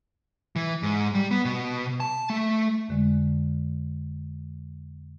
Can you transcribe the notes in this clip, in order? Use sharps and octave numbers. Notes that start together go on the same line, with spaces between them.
E3
G#2
G3
B3
B2
A5
A3
F2 D3 G#3